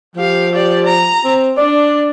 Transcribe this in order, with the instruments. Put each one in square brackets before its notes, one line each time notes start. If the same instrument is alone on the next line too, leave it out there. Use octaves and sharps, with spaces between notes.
[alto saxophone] F3 [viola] G4 F5
[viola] G4 D5
A#5
[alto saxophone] C4
[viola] D4 [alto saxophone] D5